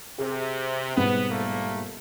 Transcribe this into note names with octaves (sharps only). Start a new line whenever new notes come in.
C3 G#4
G#2 B2 G3 B3
A#1 A3 A#3